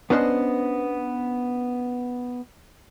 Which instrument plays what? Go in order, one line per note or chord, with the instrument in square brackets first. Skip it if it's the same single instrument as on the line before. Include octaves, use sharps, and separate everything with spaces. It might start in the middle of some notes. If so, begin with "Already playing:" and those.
[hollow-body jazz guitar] B3 C#4 D4 B4 C5 D#5